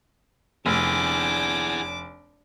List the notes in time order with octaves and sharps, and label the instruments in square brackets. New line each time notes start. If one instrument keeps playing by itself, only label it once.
[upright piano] F1 [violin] D4 D6 [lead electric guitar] E4 G#4